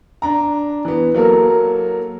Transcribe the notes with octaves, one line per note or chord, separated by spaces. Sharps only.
D4 A#5
E3 B3
F#3 A#3 A4 A#4